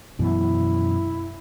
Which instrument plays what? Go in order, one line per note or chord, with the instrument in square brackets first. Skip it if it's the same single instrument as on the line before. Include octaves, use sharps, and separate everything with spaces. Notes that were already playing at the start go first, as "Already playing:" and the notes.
[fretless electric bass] F#2 B2 E3 [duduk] E4